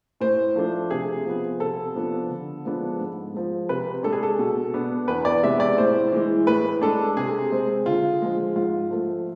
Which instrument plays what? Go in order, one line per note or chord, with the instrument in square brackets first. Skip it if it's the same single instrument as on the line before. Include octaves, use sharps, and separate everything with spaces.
[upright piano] A2 C5
F3 A3 D4
C3 G#4
F3 B3
C3 A4
F3 B3 D4
D3
F3 G#3 B3 D4
G#2
F3 G#3
C3 B4
G#3 D4 A4
G#4
A4
B2
B3 D4
E2 B4
D5
C3 G#3 B3 E5
D5
A2 C5
E3 G#3
A2 B4
G#3 D4 A4
C3 G#4
G#3 C4
D3 F4
F3 G#3
G#2 F4
F3 A3